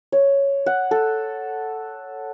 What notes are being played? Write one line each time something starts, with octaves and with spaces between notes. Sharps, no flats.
C#5
F#5
A4